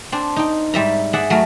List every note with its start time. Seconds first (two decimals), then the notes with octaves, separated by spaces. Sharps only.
0.12 C4 D4
0.36 D#4 G5
0.74 G#2 G3 E5 A#5
1.13 G#4 D5 E5 F#5
1.30 F#3 A3 A#4